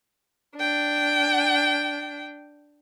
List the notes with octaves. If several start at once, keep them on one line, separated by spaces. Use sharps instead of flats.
D4 G5